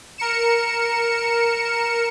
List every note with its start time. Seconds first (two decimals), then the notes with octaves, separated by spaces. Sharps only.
0.18 A#4 C#7 E7